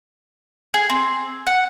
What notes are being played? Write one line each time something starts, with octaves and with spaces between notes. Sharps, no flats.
G#4
C4
F#5